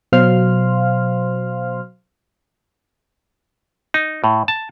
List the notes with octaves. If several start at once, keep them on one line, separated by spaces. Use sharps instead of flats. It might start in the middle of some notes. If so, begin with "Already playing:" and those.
B2 F#3 C5 F5 C6 F6
D#4
A2
A5